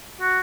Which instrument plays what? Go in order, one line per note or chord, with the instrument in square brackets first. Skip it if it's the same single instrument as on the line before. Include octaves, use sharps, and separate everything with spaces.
[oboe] F#4